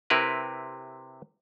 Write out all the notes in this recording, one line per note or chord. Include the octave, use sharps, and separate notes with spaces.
C3 C4 E4 A#4 B4